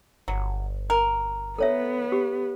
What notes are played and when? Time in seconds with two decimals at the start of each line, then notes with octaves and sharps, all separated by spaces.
0.28 G1 F#3
0.90 A#4
1.58 B3 A4 C#5 E5
2.12 G4